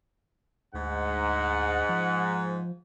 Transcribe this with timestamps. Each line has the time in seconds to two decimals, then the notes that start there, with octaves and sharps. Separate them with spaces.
0.74 D2 G#2 F#5
1.89 F3